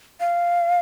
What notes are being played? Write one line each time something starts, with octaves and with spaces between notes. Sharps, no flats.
F5